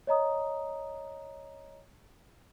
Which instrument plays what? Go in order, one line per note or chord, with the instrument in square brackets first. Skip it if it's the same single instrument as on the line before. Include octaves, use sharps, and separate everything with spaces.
[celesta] C#5 D#5 A#5 D#6